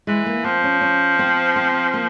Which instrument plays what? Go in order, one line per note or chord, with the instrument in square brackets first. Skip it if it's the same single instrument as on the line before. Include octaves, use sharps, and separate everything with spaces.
[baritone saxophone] E3 [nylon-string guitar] G#3
[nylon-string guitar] A#3
[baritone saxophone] F3 [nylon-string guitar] C4
[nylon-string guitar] C#4
C#4
C4
C4
A#3